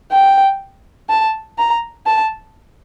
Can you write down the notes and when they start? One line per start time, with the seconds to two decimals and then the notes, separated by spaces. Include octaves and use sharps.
0.12 G5
1.09 A5
1.58 A#5
2.06 A5